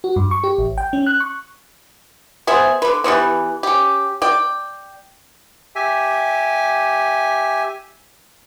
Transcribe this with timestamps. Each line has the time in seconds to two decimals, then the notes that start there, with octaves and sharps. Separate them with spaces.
0.04 F#4
0.16 G2
0.31 C#6
0.44 G4
0.58 A1
0.78 G5
0.93 C#4
1.06 F#6
1.20 C#6
2.47 B3 C4 G#4 E5
2.82 D3 B4
3.04 E3 G3 B3 C4
3.63 C#4 G4
4.22 D5 G5
5.75 G4 E5 G#5